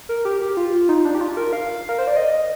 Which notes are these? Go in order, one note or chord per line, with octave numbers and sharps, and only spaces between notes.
A#4
G4
G4
F4
D#4
D4
G4
F4
A#4
F5
A#4
C5
D5
D#5